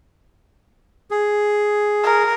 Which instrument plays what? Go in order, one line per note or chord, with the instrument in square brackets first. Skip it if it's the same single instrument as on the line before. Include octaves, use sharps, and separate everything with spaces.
[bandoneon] G#4
[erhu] A#4